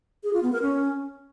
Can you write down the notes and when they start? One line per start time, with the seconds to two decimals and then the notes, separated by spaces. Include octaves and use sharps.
0.23 G#4
0.33 F4
0.43 B3
0.52 A#4
0.62 C#4